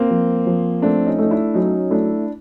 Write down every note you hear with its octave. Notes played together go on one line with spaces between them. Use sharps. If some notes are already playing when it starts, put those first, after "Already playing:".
Already playing: A#3 C4
F3
F3
A3 C4 D4
C#4 D#4
A3 D#4
D4 E4
F#3 C#4 D#4
A3 D4 E4